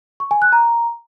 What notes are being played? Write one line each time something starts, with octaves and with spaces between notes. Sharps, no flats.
C#6
G#5
F#6
A#5